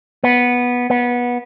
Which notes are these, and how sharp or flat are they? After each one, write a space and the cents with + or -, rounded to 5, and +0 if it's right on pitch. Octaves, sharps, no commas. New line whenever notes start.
B3 -10
B3 -20